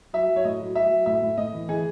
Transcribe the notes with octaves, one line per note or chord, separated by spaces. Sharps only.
F#3 E5
F#3
C#5
A2 D#5
F#3
F#3 E5
F#3
A2 E5
A2
A2 D#5
E3
E3 G#4